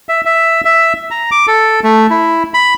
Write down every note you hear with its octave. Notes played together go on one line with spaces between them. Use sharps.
E5
E5
E5
A#5
D6
A4
A3
E4
B5